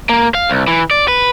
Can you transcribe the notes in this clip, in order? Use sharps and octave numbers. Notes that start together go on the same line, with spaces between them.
A#3
F5
C2
E3
D5
B4